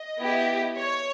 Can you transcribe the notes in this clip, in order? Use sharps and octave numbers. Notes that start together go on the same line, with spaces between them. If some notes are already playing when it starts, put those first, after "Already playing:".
Already playing: D#5
B3 E4 G4
C#5